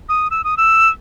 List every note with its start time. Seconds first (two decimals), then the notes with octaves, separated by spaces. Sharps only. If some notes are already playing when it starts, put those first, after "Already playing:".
0.09 D#6
0.31 E6
0.44 D#6
0.57 E6